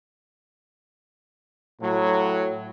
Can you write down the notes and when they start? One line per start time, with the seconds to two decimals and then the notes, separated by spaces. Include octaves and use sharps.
1.80 A2 F#3